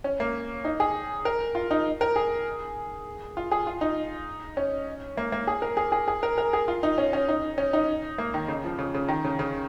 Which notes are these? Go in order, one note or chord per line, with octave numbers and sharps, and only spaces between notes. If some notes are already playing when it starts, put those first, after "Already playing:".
C#4
A#3
D#4
G#4
A#4
F4
D#4
A#4
G#4
F4
G#4
F4
D#4
C#4
A#3
A#3
G#4
A#4
G#4
G#4
G#4
A#4
A#4
G#4
F4
D#4
C#4
C#4
D#4
C#4
D#4
A#3
D#3
C#3
F3
C#3
C#3
D#3
C#3
C#3